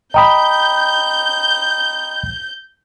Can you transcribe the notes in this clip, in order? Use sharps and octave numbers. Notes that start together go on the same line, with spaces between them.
D#5 G5 A#5 B5 D#6 G6